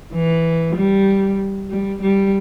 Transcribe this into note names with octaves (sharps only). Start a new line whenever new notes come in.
E3
G3
G3
G3